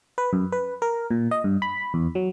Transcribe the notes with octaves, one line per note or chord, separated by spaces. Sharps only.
B4
F#2
B4
A#4
A#2
D#5
G2
B5
E2
F#3